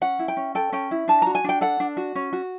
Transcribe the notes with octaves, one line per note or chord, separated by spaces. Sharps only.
C#4 F#5
E4
G5
C#4
A4 G5
C#4 G5
E4
D4 A5
F#4 A#5
G#5
D4 G5
A4 F#5
D4
F#4
C#4
F#4